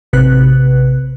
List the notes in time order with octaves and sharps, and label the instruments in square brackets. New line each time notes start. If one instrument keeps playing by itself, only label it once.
[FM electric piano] A1 C3 B4 F#6